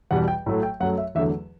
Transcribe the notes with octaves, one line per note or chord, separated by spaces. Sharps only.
E2 B2 G3 F#5
G5
A2 F#3 A3
G5
F#2 F#3 A3 F#5
E5
E2 D3 F#3 A3 E5